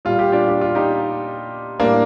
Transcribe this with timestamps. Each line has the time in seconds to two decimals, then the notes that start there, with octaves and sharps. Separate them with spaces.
0.05 A#2 G3 F4
0.19 G4
0.32 D4 F4
0.48 G4
0.61 F4
0.75 D#4 G4
1.79 A2 G3 A#3 D4